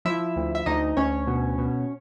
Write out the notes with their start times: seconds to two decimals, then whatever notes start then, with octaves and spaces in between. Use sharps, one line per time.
0.05 F3 E4 E5
0.36 D2
0.55 E5
0.66 D2 D#4 D#5
0.97 D2 C#4 C#5
1.27 B2
1.58 B2